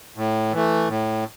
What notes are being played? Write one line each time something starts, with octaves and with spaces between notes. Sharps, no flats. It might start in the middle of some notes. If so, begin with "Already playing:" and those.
A2
E3 A3
A2